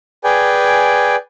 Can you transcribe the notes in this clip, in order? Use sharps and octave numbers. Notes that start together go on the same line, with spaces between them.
G#4 B4 D5 G5 G#5